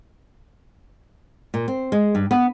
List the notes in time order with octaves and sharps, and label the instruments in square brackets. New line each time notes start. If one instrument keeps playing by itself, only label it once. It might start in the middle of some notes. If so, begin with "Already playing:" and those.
[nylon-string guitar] A#2
C4
G#3
G2
B3